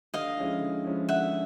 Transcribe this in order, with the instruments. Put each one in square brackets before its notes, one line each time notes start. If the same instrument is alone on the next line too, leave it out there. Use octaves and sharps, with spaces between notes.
[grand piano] D3 [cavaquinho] D#5 F5
[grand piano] F3 G#3 C#4 E4
D3
F3 G#3 C#4 E4
[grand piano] D3 [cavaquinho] E5 F#5